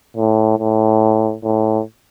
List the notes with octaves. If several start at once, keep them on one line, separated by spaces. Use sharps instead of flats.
A2
A2
A2